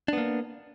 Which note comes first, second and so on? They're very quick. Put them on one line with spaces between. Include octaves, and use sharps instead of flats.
D4 B3 A#3